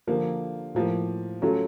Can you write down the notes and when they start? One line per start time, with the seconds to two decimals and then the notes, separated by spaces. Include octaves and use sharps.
0.07 D3 F3 A#3
0.75 A2 F3 A#3
1.42 F#3 A3 C#4 F4 A4